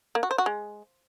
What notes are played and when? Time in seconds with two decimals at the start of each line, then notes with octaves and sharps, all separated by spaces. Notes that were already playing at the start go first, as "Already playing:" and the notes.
0.15 A#3
0.23 F#4
0.31 C5
0.38 F#4
0.46 G#3